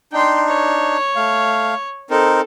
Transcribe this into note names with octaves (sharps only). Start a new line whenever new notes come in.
D4 D#4 G5 C6
C#5
A3 F5
C4 D#4 A4 A#4